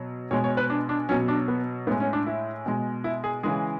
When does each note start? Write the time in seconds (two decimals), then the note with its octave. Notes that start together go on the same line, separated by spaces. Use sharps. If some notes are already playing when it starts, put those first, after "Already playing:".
Already playing: B2 F#3
0.31 B2 G#3 C#5
0.44 C#5
0.57 B4
0.70 D4
0.89 D4
1.09 B2 F#3 C#4
1.28 D4
1.48 B3
1.87 A2 B3
1.91 G#3
2.00 C#4
2.13 D4
2.27 E4
2.66 B2 G#3
3.04 E4
3.24 G#4
3.43 C#3 E3 G#3 G#4